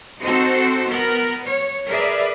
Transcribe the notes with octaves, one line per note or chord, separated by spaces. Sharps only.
C4 D#4 F#4 A4 C5
B3 A#4
C#5
G#4 A#4 B4 D5 E5